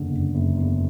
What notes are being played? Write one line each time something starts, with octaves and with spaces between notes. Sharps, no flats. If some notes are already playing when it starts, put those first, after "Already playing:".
Already playing: F#1 E2 D3
F#1
F#1
E2